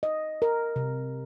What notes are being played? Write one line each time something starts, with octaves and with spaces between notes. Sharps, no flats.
D#5
A#4
C3